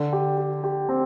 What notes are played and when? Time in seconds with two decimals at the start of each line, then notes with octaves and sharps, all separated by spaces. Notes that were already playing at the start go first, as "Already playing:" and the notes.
Already playing: D3
0.13 G4
0.38 G4
0.64 G4
0.89 C4